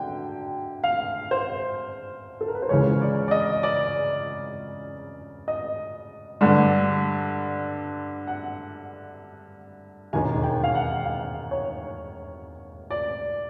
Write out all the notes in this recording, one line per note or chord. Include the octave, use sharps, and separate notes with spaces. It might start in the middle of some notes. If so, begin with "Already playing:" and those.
Already playing: D3 F#3 G5
F5
C5
A4
A#4
B4
C5
C#2 C#3 E3 G#3 C#5
D5
D5
D#5
D5
D#5
G2 D3 G3
F#5
E1 D#2 D#3 G#5
G5
F5
F#5
F5
C#5
D5